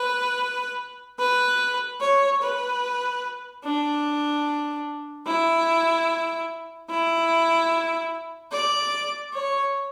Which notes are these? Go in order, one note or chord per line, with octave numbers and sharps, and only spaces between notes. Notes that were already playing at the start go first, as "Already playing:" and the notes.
Already playing: B4
B4
C#5
B4
D4
E4
E4
D5
C#5